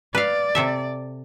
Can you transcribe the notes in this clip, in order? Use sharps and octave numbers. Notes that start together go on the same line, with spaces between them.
B4 D5 F5
C3 A4 E5